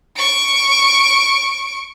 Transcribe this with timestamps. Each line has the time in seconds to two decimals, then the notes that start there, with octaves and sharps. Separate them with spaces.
0.16 C#6 D7